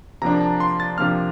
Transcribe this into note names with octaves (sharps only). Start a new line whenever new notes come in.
C3 F3 A#3 D4 A#5
A5
C6
A6
C3 F3 A#3 D4 F6